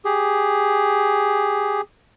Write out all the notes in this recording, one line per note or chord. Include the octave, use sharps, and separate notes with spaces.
G4 G#4